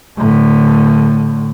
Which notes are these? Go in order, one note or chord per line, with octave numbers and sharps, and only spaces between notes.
A2 D3